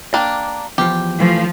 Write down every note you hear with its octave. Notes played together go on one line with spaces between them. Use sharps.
A#3 D4 G5
E2 F3 G4
E3 F3 A3